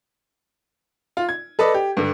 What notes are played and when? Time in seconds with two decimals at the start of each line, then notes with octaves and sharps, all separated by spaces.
1.17 F4
1.29 G#6
1.59 A4 B4 D5 D#5
1.74 G4
1.97 G2 D3